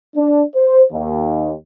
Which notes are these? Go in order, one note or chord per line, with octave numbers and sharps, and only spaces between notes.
D4
C5
D#2